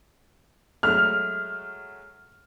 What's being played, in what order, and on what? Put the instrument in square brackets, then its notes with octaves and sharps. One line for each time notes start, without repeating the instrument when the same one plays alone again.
[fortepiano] F#3 G#3 A3 [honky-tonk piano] F6